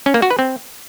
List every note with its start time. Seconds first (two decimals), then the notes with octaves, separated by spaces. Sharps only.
0.06 C#4
0.14 A#3
0.22 F#4
0.31 B4
0.39 C4